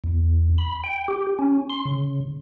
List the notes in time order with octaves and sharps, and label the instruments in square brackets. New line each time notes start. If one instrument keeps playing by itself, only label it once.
[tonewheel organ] E2
B5
G5
G4
C#4
C6
C#3